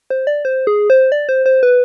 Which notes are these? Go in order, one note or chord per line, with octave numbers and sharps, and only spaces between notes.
C5
D5
C5
G#4
C5
D5
C5
C5
B4